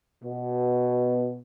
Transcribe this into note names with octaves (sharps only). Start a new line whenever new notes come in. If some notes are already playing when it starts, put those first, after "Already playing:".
B2